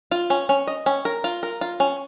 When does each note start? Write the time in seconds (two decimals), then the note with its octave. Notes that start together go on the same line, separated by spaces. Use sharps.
0.11 F4
0.30 C#4
0.49 C#4
0.67 D#5
0.86 C#4
1.05 A#4
1.24 F4
1.43 A#4
1.61 F4
1.80 C#4